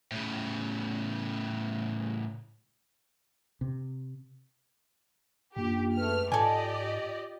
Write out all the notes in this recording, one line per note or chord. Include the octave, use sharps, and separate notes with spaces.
A2 C#3
C3
F#2 A#3 D4 F4 G4
A3 G#4 B4 F6
G#2 F4 G4 A4 D5 D#5 G#5